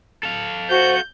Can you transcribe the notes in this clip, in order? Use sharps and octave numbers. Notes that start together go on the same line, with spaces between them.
A4 F5
F#4 C5 G6